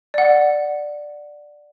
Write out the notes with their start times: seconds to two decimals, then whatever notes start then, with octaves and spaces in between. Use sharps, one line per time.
0.14 D5 F#5